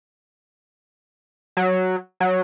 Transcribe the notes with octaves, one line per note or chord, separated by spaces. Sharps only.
F#3
F#3